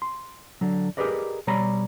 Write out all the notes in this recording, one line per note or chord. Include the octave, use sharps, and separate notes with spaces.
C6
D3 F#3
G4 G#4 A#4 B4 D5 D#5
B2 G3 C#5 D5 A#5 B5